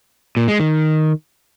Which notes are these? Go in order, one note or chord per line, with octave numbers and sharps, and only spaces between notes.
A#2
G#3
D#3